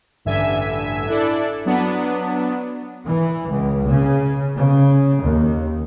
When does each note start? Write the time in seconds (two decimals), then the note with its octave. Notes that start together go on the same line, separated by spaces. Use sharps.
0.25 A1 G2 D3 E5 G#5
1.08 D4 E4 A4 D5
1.65 F#3 B3 D4
3.09 E3
3.49 C#2
3.90 C#3
4.56 C#3
5.22 D#2